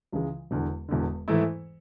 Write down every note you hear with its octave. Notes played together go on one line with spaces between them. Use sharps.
C#2 C#3 E3 G#3
E1 E2 D3
E1 E2 D3
G#2 E3 A3 E4